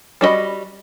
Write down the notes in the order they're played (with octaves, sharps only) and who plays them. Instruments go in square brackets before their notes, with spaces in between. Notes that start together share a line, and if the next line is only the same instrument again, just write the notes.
[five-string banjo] G3 D4 F#4 D#5 B5